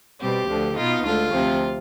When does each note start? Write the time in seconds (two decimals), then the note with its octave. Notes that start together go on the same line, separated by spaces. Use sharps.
0.19 B2 G3 C4 G4
0.48 D2 D3 F3
0.76 B2 B3 D#4 F4
1.04 D2 D3 G#3 F4
1.33 D2 C3 F3 C4